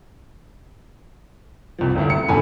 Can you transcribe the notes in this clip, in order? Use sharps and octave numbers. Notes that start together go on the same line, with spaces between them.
C2 F3
D#1 D2 E4
C#7
D#1 A#1 E2 D3 G#5 B5